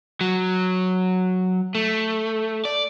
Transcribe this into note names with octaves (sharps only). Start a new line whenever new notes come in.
F#3
A3
D5